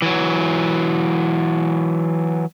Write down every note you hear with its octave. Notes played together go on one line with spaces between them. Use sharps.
E3 F#3